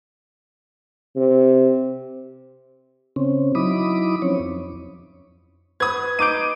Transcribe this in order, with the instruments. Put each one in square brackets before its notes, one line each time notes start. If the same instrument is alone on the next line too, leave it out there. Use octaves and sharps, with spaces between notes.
[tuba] C3
[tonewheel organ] C#3 C4 C#4
F#3 D#4 E4 B5 D6 D#6
F3 C4 C#4 C#5
F2
[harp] B4 [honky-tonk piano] D#6 G#6
[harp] D#4 D6 G6 [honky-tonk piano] D7 D#7